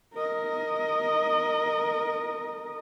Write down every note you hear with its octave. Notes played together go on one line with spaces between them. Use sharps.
A#4 D#5